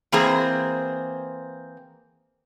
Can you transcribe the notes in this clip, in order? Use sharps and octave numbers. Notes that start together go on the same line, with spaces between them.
E3 A#3 C4 G#4